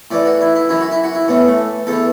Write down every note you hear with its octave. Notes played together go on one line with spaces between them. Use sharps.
A2 E3 D5
F#4
E4
E4
F#2 E3 E4
F#4
E4
F#4
E4
A2 E3 B3
A3
E2 E3 A4